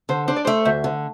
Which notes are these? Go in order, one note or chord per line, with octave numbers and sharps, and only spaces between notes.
D3 C5
D4 C5
D5
A3 C5
D2 C5 E5
D3